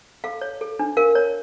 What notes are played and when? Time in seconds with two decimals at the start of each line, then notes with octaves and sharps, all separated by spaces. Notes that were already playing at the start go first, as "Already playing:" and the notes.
0.24 A4 F5
0.41 C#5
0.61 A4
0.79 D4
0.97 A#4 F5
1.15 C#5